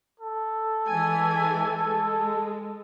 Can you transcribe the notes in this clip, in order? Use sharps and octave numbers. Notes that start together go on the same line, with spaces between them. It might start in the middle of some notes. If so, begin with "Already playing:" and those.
A4
E3 G#3 G#5
G#3